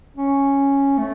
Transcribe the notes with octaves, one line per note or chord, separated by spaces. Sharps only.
C#4
A3